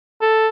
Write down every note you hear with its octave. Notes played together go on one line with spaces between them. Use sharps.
A4